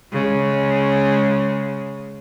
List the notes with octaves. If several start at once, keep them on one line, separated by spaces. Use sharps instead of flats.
C#3 G#3